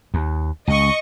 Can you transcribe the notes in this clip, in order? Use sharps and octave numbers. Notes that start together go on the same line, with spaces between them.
D#2
C#2 D#5 C#6